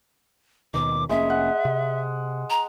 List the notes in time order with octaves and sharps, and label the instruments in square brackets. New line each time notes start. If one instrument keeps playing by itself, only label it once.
[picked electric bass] D#2 B2 D#3 [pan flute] D6
[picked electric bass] F1 A#3 C#4 [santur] G#3 [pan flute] E5
[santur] F#5
[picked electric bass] C3
[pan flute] A#5